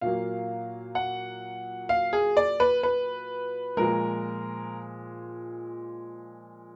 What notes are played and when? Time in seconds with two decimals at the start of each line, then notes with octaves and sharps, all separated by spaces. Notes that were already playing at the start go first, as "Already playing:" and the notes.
0.01 A#2 F#3 A#3 F5
0.95 F#5
1.89 F5
2.13 G#4
2.37 D5
2.60 B4
2.83 B4
3.77 A#2 F3 G#3 A#4